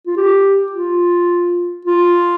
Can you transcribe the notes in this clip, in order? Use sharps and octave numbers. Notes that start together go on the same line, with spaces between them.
F4
G4
F4
F4